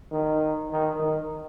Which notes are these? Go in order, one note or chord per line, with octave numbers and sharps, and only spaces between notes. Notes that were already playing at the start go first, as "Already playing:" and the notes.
D#3
D#3
D#3